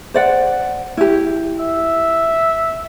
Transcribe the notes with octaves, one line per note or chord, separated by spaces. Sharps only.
C5 D5 F#5
E4 G4
E5